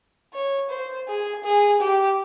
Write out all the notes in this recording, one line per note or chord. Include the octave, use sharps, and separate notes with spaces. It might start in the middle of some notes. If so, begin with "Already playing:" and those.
C#5
C5
G#4
G#4
G4